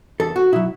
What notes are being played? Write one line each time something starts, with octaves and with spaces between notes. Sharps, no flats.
E2 A4
F#4
B2 F#3 E4